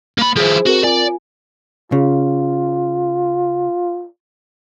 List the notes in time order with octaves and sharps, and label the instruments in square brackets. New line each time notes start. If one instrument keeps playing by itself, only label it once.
[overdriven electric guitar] A#3 B5
[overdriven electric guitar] F3 E4 [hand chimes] G#4 C5
[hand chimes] C4 A#4 [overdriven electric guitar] F#4
[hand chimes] F4 G#5 [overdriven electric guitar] D5
[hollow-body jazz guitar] C#3 [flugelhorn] F4